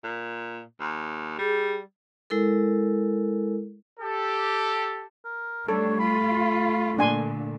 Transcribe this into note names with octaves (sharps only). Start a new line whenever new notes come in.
A#2
D#2
G3 G#4
G#3 E4 A4 A#4
G4 A4
A#4
G3 A3 D4 A4 C#5
F4 B5
A#2 D3 D4 G#5 C6